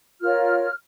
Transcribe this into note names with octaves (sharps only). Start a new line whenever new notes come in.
F4 A#4 C#5 F6